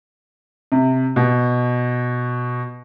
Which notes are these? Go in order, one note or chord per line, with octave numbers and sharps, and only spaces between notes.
C3
B2